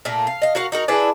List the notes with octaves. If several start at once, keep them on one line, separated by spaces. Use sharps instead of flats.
A#2 A3 A#3
F5
D#5 F5
F#4 A#4 F5 F#5
D#4 F#4 A#4
D4 E4 G#4 B4